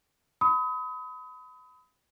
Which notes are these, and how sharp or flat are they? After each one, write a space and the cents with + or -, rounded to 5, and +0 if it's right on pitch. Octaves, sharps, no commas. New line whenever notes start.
B5 +30 D#6 +35